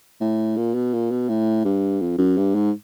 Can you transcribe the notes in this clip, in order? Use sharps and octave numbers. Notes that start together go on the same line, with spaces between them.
A2
A#2
B2
A#2
B2
A2
G2
F2
F#2
G2
G#2